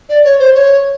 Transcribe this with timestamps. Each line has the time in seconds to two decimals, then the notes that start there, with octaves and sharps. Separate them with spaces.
0.09 D5
0.24 C#5
0.39 C5
0.55 C#5